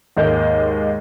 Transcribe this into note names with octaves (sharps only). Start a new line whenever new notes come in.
D#2 G#2 G#3 A#3 G6